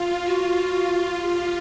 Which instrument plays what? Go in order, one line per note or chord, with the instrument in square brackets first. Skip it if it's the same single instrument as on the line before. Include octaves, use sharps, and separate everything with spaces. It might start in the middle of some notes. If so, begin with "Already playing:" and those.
Already playing: [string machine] F4
[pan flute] F#4
[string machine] F4 [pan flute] G4